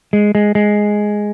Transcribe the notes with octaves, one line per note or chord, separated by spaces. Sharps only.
G#3
G#3
G#3